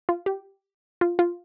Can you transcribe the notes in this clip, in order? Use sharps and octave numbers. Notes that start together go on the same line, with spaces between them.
F4
G4
F4
F4